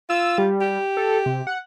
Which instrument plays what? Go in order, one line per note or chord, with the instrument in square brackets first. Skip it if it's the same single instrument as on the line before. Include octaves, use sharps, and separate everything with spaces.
[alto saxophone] F4 [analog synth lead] E6
[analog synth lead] G3
[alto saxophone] G4
[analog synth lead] A4
C3
F#5